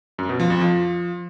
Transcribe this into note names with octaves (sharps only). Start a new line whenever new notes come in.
F#2
B2
F3
F2
F3